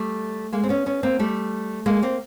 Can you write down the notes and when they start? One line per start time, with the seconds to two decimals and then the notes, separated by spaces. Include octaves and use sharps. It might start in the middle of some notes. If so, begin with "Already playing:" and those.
Already playing: G3 A3
0.53 G#3 A#3
0.64 C4
0.69 B3 C#4
0.86 B3 C#4
1.03 A#3 C4
1.19 G3 A3
1.86 G#3 A#3
2.03 A#3 C4